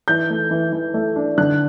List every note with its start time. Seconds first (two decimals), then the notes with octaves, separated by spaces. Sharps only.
0.08 E3 G6
0.30 A3
0.51 E3
0.72 E3
0.94 A3
1.16 D4
1.38 D3 F#6